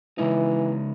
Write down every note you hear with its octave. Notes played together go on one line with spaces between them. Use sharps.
C#3 E3 G#3 D#4